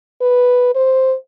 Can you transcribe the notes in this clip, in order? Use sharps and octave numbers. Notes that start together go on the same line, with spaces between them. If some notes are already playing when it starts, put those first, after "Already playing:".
B4
C5